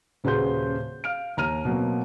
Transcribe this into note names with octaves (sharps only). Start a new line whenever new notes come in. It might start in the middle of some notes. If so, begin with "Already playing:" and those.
D#1 C#3 F#4 B4 C6 G6
F5 F6 D7
D#2 A#5 F6 D#7
B2 F#3 A#3 C4